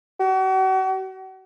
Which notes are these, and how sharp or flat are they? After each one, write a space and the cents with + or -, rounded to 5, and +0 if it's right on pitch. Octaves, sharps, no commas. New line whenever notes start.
F#4 +40